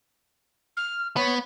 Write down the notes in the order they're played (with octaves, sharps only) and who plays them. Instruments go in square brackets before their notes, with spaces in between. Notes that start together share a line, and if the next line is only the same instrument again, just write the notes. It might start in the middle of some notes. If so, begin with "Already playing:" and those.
[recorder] F6
[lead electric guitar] B3 [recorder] C#5